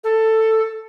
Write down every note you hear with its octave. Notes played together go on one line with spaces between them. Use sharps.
A4